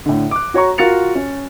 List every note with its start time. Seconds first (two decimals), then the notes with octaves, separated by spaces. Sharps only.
0.06 A2 D3
0.31 D6 F#6
0.54 F#4 C#5 A#5 C#6
0.78 F4 F#4 A#4 A6 C#7 F7
1.15 C#4